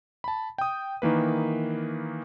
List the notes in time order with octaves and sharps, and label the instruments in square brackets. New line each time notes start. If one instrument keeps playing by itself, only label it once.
[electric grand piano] A5 B5
G5 D#6
D#3 E3 A#3 B4